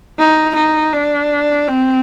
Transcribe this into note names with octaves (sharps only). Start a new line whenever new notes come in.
D#4
D#4
D4
C4